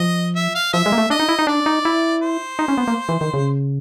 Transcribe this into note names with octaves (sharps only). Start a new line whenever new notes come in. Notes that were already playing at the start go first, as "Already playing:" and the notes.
Already playing: F3 D#5
E5
F5
F3 E5
G#3
A#3
A3
D4 D#5
D#4
E4
D#4
D4 D5
D#4
E4
C5
D#4
C#4
B3
A#3
E3
D#3
C#3